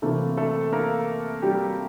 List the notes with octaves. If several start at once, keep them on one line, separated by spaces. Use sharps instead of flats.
C3 E3 A3 A#3 A4
A3 A4
A#3 A#4
G3 G4